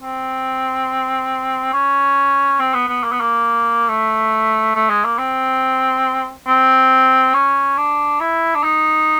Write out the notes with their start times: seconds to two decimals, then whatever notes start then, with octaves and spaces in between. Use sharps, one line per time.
0.02 C4
1.74 C#4
2.60 C4
2.74 B3
2.88 B3
3.04 A#3
3.12 B3
3.21 A#3
3.89 A3
4.76 A3
4.89 G#3
5.05 A#3
5.18 C4
6.48 C4
7.35 C#4
7.78 D4
8.20 E4
8.55 D4
8.63 D#4